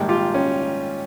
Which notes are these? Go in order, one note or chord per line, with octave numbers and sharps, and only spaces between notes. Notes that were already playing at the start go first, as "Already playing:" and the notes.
Already playing: A#1 G#2 D#3 G3
F4 G4
C#4